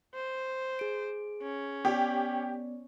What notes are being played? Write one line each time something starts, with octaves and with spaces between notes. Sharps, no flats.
C5
G#4 D7
C#4
B3 G4 D5